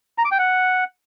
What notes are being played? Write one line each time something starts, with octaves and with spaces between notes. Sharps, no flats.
A#5
D6
G5
F#5